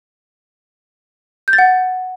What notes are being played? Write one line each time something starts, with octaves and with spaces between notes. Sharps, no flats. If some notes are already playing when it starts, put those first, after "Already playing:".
G6
A6
F#5